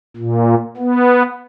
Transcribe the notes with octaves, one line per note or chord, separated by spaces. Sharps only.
A#2
B3